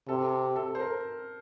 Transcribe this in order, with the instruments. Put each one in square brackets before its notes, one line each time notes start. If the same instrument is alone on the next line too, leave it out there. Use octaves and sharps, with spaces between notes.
[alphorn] C3 [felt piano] A4
[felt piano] A4
C5
A#4